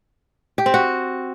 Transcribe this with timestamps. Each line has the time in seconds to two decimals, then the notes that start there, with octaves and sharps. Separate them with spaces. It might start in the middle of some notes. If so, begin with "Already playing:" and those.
0.58 G4
0.66 C4
0.74 F#4